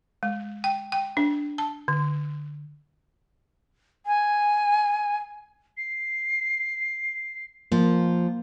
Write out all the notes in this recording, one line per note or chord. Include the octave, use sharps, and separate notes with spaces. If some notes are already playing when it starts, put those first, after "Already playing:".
G#3
G5
G5
D4
A5
D3
G#5
C7
F3 A#3